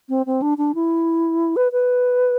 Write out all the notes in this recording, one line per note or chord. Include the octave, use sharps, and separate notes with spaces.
C4
C4
D4
D4
E4
B4
B4